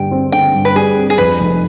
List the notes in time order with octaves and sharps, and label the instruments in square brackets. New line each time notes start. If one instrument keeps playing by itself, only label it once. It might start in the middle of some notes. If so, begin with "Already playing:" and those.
Already playing: [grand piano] G2 D3 G3 [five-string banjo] G5
[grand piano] C4
[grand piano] D3 [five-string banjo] G5
[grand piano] G2
[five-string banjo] B4
[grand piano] G3 [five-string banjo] G#4
[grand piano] C4
[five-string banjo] G#4
[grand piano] F2 [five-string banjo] B4
[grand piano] F1